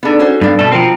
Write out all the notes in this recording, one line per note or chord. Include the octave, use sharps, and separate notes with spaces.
B3 D4 D#4 G#4 A4
C#4 F#4 C5
G2 B3 D4 F5
B2 A3 A4
F3 C4 A#4 G5 A#5